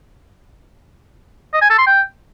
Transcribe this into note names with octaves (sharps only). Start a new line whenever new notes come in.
D#5
G#5
A4
C6
G5